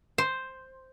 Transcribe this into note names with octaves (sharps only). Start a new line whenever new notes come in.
C5